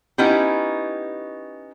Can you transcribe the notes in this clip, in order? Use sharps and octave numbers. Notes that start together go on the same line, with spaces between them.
B3 C#4 D#4 E4 G4